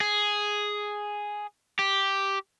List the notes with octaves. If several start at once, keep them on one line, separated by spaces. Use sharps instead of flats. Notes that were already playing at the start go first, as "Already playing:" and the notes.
G#4
G4